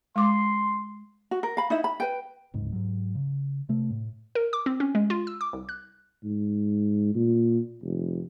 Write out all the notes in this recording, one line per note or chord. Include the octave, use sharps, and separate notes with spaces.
G#3 C6 D6
F#4
A#4
F5 B5
D#4 E4 E5
B5
B4 G5
D1 C#2 G#2
G#2 F#3
C#3
C3 A3
A2
A#4
D6
C4
C#4
G#3
F4
E6
D6
C2
F#6
G#2
A#2
F1